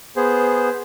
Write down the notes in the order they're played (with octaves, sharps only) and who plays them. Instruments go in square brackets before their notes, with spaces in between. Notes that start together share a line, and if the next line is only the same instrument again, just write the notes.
[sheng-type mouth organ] B3 G#4 C5